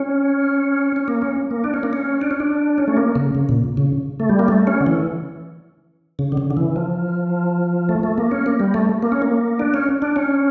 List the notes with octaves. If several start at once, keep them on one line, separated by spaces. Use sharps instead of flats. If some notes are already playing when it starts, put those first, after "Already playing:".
Already playing: C#4
C#4
A#3
C#4
A#3
D4
C#4
A#3
C#4
D4
C#4
D4
C#4
A3
A#3
C#3
C#3
A#2
C#3
A3
G3
A#3
A3
C#4
D3
E3
C#3
D3
C#3
D3
E3
F3
A3
A3
A#3
C#4
A#3
G3
A3
A#3
C#4
A#3
D4
C#4
D4
C#4